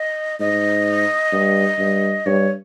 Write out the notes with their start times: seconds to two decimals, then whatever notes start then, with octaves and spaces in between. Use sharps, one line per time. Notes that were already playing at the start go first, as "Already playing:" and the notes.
Already playing: D#5
0.40 G#2 D#5
1.33 G2
1.79 G2
2.26 G2 C#5